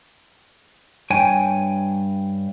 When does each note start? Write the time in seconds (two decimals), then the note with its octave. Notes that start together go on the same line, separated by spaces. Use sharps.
1.10 G2 C#5 G5 G#5